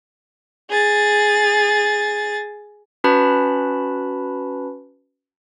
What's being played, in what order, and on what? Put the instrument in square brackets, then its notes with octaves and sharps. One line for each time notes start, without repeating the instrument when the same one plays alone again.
[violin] G#4 A6
[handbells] C#4 F#4 B4 A5 B5